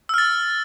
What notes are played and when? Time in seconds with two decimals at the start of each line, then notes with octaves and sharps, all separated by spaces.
0.09 E6
0.14 F6
0.18 A6